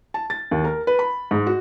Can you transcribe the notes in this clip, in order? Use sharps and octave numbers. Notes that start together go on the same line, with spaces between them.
A5
A6
D#2
A#4
B4
B5
G#2
F#4